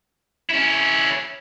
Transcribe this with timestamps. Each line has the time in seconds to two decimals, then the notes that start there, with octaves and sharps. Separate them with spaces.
0.50 C#4 E4